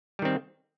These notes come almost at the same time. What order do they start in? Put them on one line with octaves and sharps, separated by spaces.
G3 D#3 C4